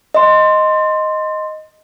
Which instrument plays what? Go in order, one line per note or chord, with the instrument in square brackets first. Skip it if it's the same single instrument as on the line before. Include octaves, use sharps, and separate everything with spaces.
[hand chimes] D#5 C6